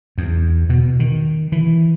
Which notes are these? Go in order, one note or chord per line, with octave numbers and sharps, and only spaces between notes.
E2
B2
D#3
E3